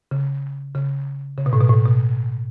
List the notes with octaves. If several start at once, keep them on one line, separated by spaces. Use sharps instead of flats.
C#3
C#3
C#3
B2
A2
B2
A2
B2